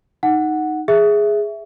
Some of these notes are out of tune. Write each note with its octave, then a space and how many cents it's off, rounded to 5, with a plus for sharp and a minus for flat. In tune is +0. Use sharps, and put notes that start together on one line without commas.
D#4 +0 F#5 +0
G#4 +0 E5 +0